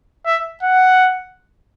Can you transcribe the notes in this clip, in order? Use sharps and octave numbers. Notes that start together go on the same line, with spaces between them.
E5
F#5